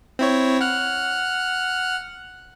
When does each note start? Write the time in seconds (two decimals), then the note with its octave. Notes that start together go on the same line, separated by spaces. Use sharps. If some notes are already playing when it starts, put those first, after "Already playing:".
0.19 C4 E4 C#5
0.61 F#5 F6 F#6